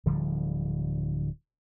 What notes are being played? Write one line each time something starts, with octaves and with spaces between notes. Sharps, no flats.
D1 D3 F3 G3